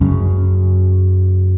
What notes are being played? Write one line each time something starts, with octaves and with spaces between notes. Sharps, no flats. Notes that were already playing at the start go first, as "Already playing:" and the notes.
F#2 C#3